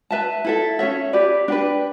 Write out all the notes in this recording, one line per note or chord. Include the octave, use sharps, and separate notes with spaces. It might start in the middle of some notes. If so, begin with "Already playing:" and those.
B4 E5 A5
E4 A4 E5
C#4 F#4 C#5 E5
G4 B4 D5
D4 G4 B4